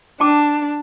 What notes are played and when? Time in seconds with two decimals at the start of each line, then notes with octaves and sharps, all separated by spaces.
0.20 D4 G5 A5 D6